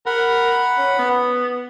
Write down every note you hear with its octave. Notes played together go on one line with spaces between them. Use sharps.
A#4 F#5 B5
C#4
B3